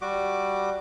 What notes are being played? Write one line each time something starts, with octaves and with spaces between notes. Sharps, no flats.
G3 F#4 D6